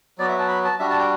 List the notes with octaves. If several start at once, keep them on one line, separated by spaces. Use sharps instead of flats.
F#3 B3 F#4 D5
E5
A5
B5
A5
G3 D4 F#4 E5
A5
G5